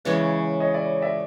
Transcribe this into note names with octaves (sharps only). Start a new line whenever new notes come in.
C#3 E3 G#3 B4 C#5
C#5 D#5
D5 E5
D5 E5